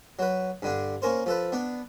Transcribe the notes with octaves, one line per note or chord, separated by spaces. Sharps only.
F#3 B4
G2 D3 D4
A#3 C#4 A#4 C5
F3 A4 B4
B3 D4